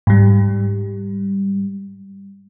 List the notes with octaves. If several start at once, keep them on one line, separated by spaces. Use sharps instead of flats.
G#2 G3